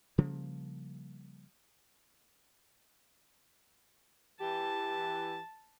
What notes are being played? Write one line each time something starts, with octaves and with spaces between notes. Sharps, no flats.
C#3 F3 G3 A#3
E3 G4 A5